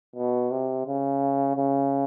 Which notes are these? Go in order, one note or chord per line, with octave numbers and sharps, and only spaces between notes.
B2
C3
C#3
C#3